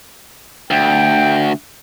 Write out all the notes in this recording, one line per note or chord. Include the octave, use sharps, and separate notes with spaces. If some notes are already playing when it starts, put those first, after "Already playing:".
D2 G5